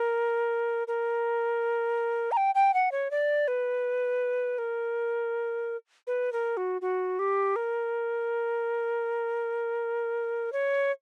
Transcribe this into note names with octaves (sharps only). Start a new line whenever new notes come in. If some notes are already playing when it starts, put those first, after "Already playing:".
Already playing: A#4
A#4
A#5
G5
G5
F#5
C#5
D5
B4
A#4
B4
A#4
F#4
F#4
G4
A#4
C#5